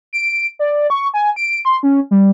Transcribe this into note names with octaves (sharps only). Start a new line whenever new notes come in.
D7
D5
C#6
G#5
D7
C6
C#4
G3